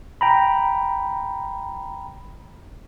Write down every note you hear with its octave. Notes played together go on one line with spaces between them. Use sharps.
G5 A#5 B5